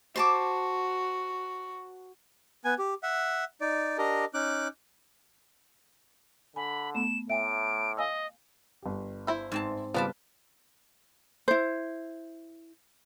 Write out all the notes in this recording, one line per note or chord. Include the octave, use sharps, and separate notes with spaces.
F#4 C5 A5 D6
B3 G#5
G4
E5 F#5
D#4 D5
D4 G4 A#4 D#5
C#4 D#4 D6 F#6
D3 G#5 B5
A3 B3 E7
A2 E5 G5 G#5 D7
D#5 F5 G#5 E6
G1 G4
E4 C5 E5
G#2 C4 A5
C#3 F3 G3 B3 F4 B4 D5 A5
E4 C5